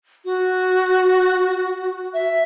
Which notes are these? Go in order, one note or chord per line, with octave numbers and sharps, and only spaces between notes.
F#4
E5